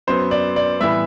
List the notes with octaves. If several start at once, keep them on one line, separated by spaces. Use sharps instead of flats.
F#2 F#3 B3 C5
D5
D5
A2 E3 G3 B3 E5